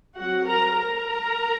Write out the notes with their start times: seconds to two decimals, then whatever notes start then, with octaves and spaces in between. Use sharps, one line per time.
0.17 F#3 C4 F#4 F#5
0.47 A#4 A#5
0.76 A#4 A#5